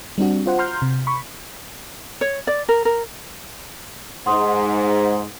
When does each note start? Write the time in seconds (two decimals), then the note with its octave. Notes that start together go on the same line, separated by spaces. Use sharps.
0.18 G3 C4 D4 F#4
0.46 F4 C5 F#5
0.58 A#5 C6 F6 G6
0.82 C3
1.07 B5 C#6
2.21 C#5
2.47 D5
2.69 A#4
2.85 A#4
4.26 G#2 F#5 C6 D#6